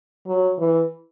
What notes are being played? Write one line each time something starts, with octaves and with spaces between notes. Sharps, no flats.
F#3
E3